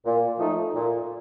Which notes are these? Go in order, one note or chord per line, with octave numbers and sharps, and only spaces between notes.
A#2
F3 A3 D#4
A#2